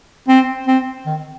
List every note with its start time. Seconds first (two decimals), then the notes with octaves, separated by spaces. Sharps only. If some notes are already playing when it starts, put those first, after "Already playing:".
0.28 C4
0.67 C4
1.06 D#3